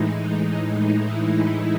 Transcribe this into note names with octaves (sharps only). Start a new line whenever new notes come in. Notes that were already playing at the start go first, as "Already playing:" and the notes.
Already playing: A2 E3 G#3 D#4
E4